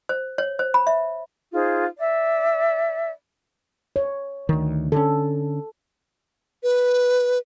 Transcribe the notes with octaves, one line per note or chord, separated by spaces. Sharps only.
C5
C#5
C5
B5
E5
D#4 F4 G#4 C5
D5 E5
C#5
D2 D#3
D3 C#4 A4
B4